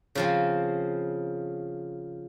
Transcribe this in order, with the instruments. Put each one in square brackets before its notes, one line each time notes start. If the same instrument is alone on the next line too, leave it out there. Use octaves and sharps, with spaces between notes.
[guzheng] C#3 F3 C4